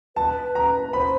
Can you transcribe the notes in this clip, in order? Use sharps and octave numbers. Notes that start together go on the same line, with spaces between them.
B4 A5
A#5
C5 B5